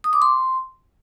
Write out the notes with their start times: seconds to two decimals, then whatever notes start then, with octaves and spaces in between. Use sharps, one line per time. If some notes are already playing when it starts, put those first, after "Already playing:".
0.04 D#6
0.13 D6
0.22 C6